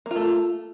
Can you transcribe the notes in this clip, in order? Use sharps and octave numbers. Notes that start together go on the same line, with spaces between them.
A3 A#3 F4